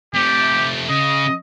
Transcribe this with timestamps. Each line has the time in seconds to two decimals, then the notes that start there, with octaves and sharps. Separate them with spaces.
0.15 C3 A3 G4
0.89 C#3 D#5